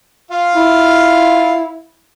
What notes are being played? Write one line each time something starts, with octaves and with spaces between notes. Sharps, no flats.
F4 F5
E4